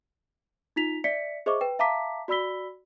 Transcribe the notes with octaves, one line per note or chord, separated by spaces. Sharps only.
D#4 F4 B6 F7
D5 E5 B6 C#7
G#4 C5 D#5 E5 C#6 D6
B4 G5
E5 F5 A5 A#5 D6 B6
F#4 D5 B5 E6 B6 G7